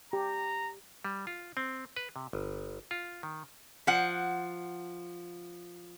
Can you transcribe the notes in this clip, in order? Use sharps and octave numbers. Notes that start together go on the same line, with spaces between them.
G4 A#5
G3
F4
C4
B4
C3
G1
F4
D#3
F3 F#5